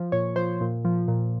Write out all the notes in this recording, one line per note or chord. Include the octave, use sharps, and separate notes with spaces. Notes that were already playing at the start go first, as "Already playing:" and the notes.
Already playing: F3
A#2 C#5
F3 C5
A#2
F3
A#2